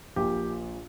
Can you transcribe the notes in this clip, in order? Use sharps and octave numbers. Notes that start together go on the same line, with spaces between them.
A#1 A#2 G4